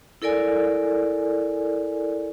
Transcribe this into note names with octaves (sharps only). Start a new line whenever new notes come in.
E4 A4 A#4 D5 G#5